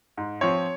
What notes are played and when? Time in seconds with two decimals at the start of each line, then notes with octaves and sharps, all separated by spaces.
0.17 G#2
0.41 F3 C4 C#5